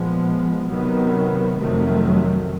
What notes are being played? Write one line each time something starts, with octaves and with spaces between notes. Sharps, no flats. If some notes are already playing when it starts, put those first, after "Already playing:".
Already playing: A#2 F3 G#3 B3
C3 D#3 F#3 B3
F2 C3 D#3 F#3 A3